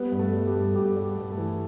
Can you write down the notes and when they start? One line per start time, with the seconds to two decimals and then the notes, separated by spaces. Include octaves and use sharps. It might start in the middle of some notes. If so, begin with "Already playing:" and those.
Already playing: G3 B3 B4
0.12 G2
0.19 A3 A4
0.33 G3
0.47 G4
0.54 G2
0.63 A4
0.75 G2 G4
0.96 G3
1.03 G4
1.18 G2
1.31 A3 A4
1.38 E3